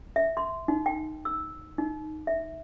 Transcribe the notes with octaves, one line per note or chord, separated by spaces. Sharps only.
E5
C6
D#4
G5
E6
D#4
E5